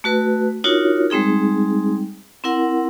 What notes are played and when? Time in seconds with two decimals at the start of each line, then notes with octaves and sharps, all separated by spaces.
0.04 A3 F#4 B4
0.64 D4 D#4 F4 F#4 A#4 C#5
1.10 G3 G#3 C4 D#4 G#4
2.44 C4 E4 A#4 F#5